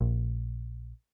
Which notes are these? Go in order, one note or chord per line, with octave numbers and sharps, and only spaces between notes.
A#1